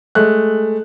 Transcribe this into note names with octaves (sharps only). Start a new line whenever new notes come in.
G#3 A3 F#6